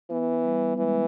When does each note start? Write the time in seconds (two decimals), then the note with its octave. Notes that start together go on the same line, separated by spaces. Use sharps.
0.10 E3 B3
0.44 G3
0.77 E3 G#3